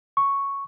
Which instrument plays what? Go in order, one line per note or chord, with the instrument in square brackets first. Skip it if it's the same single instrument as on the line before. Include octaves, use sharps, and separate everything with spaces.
[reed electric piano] C#6